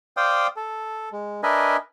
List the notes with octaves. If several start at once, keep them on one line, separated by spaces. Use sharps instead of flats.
C5 D5 F5 G5 D#6
A4
G#3
D4 A#4 B4 D#5 E5 G#5